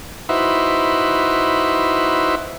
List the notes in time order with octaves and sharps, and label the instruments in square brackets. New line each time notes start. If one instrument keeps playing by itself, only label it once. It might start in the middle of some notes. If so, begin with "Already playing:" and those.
[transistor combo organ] D#4 E4 F#4 B4 C5 E5